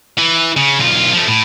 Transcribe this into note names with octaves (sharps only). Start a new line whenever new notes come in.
E3
C#3
B1 F4
F3 A3
A2